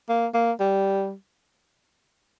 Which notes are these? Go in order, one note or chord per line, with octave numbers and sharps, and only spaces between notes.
A#3
A#3
G3